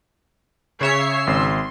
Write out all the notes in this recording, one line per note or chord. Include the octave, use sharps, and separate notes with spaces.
C#3 C#5 E5 C7
G#1 C6